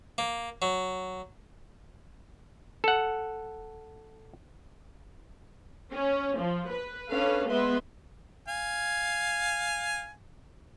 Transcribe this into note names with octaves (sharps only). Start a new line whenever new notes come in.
A#3
F#3
A4 F#5
C#4
F3
B4
C#4 D4 A4 B4 F5
G#3 B3 B4 E5 C6
F5 G#5